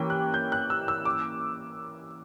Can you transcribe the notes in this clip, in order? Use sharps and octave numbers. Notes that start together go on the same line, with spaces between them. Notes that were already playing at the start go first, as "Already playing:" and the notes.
Already playing: E3 A#3 C#4 G4 G5
F#6
G6
F#6
E6
E6
D6